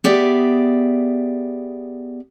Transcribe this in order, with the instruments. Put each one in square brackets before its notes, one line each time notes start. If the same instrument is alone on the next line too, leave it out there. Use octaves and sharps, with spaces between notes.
[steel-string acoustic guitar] B3 G4 G#4 D5 E5